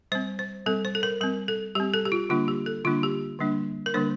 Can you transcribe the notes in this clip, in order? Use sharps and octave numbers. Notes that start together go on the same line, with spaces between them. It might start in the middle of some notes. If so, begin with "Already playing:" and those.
G3 C4 C5
C5
G3 C4 A4
C5
A4
A#4
G3 C4 A#4
A4
G3 C4 G4
A4
G4
F4
D3 G3 A#3 D4 F4
G4
A4
D3 G3 A#3 D4 F4
G4
D3 G3 A#3 D4
A#4
D3 G3 A#3 D4 C5